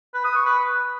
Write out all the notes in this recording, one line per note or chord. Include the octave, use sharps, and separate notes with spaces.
B4
D#6
C#6
B4